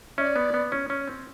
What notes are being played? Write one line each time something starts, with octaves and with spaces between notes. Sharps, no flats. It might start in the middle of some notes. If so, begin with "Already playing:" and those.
C#4 D5 E5
B3
B3
C#4
C#4
C4